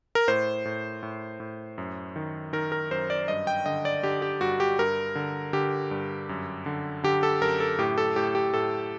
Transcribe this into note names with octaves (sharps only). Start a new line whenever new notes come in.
A#4
A2 C5
A2
A2
A2
F#2
D#3
D#3 A#4
A#4
F#2 C5
D5
G2 D#5
G5
D3 D#5
D5
D3 G4
G4
G2 F#4
G4
G2 A#4
D3
D3 G4
G2
F#2
D3
D3 G4
A4
F#2 A#4
A4
A2 G4
A4
A2 G4
G4
A2 A4